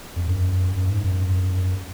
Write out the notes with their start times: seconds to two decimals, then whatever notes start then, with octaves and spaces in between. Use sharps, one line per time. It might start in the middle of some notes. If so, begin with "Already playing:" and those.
0.16 F2
0.28 F#2
0.76 F#2
0.90 G#2
1.03 F#2